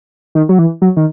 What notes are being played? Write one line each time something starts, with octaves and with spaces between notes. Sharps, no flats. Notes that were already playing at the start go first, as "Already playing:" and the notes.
D#3
F#3
E3
F#3
D#3